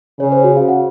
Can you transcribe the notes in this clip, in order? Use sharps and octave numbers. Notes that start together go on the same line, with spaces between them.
C#3 C#5
C5
F#4
F5
F#5